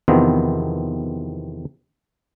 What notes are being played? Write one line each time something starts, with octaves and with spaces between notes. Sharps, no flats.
E2 C3 D#3 F3 B3 C4